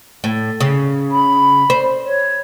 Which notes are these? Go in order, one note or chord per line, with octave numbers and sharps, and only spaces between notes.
A2
C#3
B5
C5
C#5